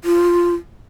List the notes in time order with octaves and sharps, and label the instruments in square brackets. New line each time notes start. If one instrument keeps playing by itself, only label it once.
[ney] F4